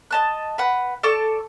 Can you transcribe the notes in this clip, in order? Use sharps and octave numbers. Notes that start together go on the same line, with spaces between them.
D#5 A5 F#6
B4 F#5
A4 D5 A5 C#6